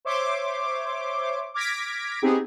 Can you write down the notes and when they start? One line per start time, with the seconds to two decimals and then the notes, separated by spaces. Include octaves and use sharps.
0.05 C5 C#5 E5 C6 D6
1.54 D6 F6 G#6 A#6 B6 D7
2.22 B3 C4 D#4 G4 G#4